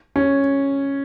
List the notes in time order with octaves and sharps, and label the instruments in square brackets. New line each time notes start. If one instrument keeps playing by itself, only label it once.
[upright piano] C#4